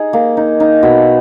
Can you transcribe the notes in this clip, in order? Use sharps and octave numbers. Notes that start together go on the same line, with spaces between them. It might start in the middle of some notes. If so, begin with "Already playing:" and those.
Already playing: D#4 G#4
A#3
D#4
D#4
B2